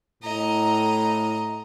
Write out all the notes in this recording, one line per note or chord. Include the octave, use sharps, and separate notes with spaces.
A2 D#5 A#5